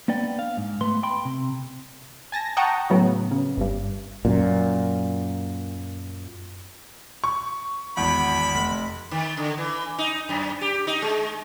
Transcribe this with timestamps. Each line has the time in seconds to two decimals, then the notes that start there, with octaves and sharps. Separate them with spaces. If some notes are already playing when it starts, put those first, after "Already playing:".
0.08 A#3 B3 D4 D5 G5
0.39 F5
0.57 G#2
0.81 A3 B3 B4 C6
1.03 G5 B5 C6
1.25 C3
2.32 G#5 A5 A#6
2.57 F#5 G5 A5 A#5 C#6 D#6
2.90 A2 C#3 F#3 B3
3.31 C#3
3.57 G1 G2
4.25 F#2 A#2
7.24 C#6
7.97 G#1 E2 B5
8.55 F1
9.11 D#3
9.37 D3
9.58 E3
9.98 D#4
10.29 F#2
10.61 G4
10.87 D#4
11.02 G#3